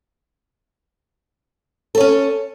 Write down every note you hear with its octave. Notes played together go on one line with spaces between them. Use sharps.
C#4 A4 C#5